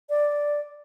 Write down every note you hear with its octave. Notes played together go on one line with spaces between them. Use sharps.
D5